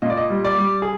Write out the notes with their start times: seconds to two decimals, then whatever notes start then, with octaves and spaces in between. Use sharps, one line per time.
0.02 A#2 D#5
0.10 D5
0.17 D#5
0.30 G3
0.45 D5
0.59 G3
0.82 G#4